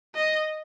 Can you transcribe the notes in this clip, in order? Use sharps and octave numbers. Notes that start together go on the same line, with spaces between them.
D#5